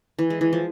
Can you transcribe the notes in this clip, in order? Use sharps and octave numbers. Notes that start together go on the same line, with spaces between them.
E3
G#3
E3
F3